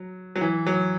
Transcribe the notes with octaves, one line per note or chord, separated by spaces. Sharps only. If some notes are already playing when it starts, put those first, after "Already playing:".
Already playing: F#3
F#3
E3
F#3